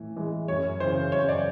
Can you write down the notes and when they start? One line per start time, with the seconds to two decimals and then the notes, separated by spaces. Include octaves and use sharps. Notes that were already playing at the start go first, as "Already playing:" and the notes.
Already playing: A2 E3
0.16 E3 G#3
0.48 F#2 C#5
0.80 C#3 E3 C5
1.12 F#2 C#5
1.29 D5